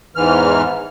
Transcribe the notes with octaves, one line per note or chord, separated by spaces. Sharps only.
E2 G#2 E3 F6